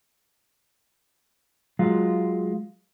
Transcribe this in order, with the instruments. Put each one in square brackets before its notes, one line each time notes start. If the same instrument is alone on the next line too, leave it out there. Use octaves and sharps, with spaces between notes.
[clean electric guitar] F#3 G#3 F4